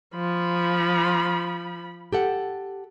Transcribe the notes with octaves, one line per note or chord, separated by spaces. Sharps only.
F3 B5
G4 A4 F#5